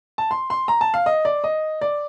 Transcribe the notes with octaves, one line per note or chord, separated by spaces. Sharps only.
A5
C6
C6
A#5
A5
F5
D#5
D5
D#5
D5